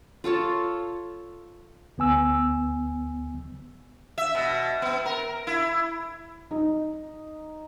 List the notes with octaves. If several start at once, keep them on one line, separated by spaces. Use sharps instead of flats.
F4 A4 C#5 A5
D2 B3 G#5 E6
E5
B2
B3
A#4
E4
D#4